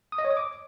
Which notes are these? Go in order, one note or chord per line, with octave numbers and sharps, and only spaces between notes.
D#6
D#5
C#5
D#6
D6